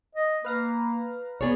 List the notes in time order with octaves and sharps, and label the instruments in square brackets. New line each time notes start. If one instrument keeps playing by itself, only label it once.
[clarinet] D#5
[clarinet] A#3 [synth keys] B4 F5 A#5
[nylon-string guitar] B3 G#4 C#5 [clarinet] D5